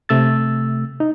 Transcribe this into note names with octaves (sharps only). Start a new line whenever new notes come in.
C3 A3 E6 A6
D#4